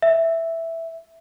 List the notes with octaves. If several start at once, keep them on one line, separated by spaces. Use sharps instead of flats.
E5